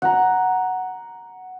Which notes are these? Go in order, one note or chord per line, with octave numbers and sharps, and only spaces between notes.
F#5 A#5